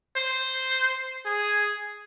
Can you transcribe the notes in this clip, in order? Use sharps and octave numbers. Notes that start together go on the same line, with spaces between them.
C5
G#4